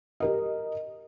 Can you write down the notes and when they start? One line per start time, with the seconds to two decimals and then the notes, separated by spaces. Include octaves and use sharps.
0.20 G4 A#4 D#5